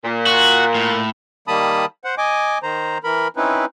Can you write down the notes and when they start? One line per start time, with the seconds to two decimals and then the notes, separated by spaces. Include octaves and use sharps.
0.04 A#2
0.26 F#4
0.75 A2
1.48 D#3 G3 A#3 A5 B5 D#6
2.04 C5 F#5
2.18 D#5 G#5 D6
2.63 D#3 C5 A#5
3.04 E3 A#4 B5
3.37 C4 C#4 D#4 E4 B4